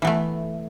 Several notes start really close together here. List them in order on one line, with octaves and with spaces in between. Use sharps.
E3 B3 A3